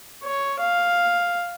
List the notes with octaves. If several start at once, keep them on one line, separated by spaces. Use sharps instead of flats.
C#5
F5